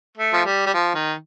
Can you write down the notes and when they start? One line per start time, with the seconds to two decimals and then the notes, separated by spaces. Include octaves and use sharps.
0.18 A3
0.33 F3
0.45 G3
0.66 G3
0.73 F3
0.95 D#3